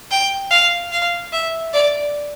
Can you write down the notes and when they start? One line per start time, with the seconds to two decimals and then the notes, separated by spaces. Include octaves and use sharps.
0.11 G5
0.51 F5
0.92 F5
1.32 E5
1.73 D5